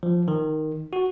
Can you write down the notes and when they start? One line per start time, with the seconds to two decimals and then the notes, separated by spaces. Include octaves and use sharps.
0.03 F3
0.28 D#3
0.93 F#4